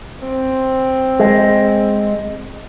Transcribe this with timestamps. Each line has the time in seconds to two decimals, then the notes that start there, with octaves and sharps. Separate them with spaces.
0.22 C4
1.20 G#3